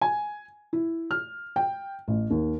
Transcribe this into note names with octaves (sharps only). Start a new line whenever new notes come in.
G#5
E4
F6
G5
A1
D#2